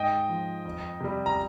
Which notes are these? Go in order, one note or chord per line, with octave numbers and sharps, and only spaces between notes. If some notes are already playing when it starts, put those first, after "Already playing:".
Already playing: G#2 D#5 G5
F3
F2
C3 G3
A#5